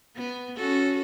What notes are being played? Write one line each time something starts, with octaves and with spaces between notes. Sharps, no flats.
B3
C#4 F#4 A4